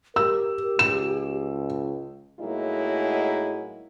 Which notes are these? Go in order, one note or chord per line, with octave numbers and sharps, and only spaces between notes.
G4 A#4 E6
C#2 E7
A2 F#3 G#3 A#3 D#4 E4